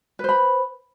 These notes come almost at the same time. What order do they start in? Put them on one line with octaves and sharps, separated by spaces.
B4 C5 B5